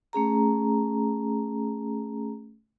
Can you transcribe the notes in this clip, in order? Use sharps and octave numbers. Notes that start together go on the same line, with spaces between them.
A3 C#4 G#4 A#5